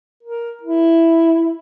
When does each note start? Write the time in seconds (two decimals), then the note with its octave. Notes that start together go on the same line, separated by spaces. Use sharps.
0.23 A#4
0.63 E4